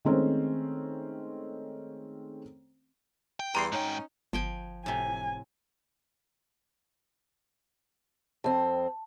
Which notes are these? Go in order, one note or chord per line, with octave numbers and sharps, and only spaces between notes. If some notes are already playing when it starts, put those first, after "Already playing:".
D#3 G#3 A3 C4 C#4 C5
G5
E2 G3 A#5 C6 C7
G#2 C#4 D#4 G5
G1 F3 G5 G#5
A2 C3 G#5
F2 C4 A5